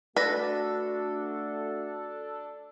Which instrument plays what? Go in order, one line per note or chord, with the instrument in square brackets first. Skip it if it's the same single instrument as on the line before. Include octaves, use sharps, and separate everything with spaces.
[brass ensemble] A3 F#4 [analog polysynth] D4 A4 [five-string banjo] B4 [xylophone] D5 A#6